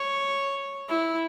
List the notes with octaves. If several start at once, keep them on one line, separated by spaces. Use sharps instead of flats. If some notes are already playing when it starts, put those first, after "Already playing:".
Already playing: C#5
E4